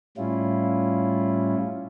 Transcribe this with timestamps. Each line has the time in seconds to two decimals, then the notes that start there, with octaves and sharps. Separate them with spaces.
0.17 A2 G3 C#4 E4 F4